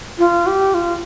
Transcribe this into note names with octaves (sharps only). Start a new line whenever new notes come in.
F4
G4
F4